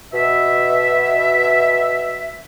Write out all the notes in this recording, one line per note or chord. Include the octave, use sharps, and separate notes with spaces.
B2 E5